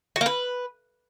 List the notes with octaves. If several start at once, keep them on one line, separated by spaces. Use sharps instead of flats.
F#4
A#3
B4